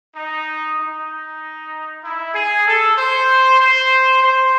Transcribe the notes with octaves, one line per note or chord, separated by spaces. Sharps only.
D#4
D#4
E4
G#4
A4
C5
C5
C5